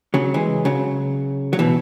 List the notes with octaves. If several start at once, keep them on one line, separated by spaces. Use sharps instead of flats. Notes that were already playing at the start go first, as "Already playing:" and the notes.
C#3 F#3
E3 G#3
C#3 F#3
F#3
B2 E3